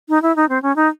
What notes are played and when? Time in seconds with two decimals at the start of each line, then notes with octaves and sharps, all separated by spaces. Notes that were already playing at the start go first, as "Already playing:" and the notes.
0.09 D#4
0.22 E4
0.36 D#4
0.49 C4
0.62 C#4
0.76 D#4